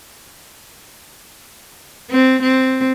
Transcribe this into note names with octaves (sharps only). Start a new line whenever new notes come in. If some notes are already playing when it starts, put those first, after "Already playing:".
C4
C4